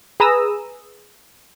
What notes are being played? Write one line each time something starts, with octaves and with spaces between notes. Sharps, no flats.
G#4 B4 A#5 D#6 E6